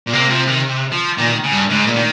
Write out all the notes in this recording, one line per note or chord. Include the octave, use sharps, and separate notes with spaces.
A#2
C3 A#3
F3
D#3
F3
A#2 D#3
C#3
G2
G#2 C#3
A#2
D#3